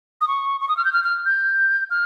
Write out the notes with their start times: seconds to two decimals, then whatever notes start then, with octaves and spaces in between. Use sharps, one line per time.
0.21 D#6
0.28 C#6
0.61 C#6
0.69 D#6
0.77 F6
0.85 G6
0.93 F6
1.04 F6
1.26 G6
1.90 F6